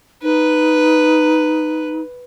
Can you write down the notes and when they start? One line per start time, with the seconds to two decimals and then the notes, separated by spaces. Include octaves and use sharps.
0.23 D#4 B4